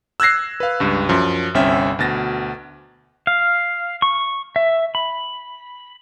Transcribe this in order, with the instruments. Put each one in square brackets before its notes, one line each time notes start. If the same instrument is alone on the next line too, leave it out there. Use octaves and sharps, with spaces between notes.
[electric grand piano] E6 F#6 G#6 A#6 C7
B4 F5
C#2 G2
F#2 F3
G1 C2 C4 C#4 E5 G5
D2 B2 A6 A#6
[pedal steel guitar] F5
C#6
E5
B5